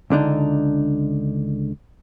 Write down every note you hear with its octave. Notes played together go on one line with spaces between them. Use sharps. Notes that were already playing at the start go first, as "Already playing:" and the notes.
C#2 D3 D4 D#4